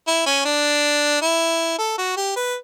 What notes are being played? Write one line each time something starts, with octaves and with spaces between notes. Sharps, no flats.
E4
C#4
D4
E4
A4
F#4
G4
B4